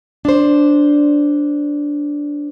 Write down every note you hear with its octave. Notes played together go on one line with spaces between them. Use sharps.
D4 C5